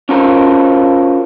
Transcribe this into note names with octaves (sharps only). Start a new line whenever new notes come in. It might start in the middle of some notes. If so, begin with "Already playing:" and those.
C#4 F4 F#4 A4 A#4 C5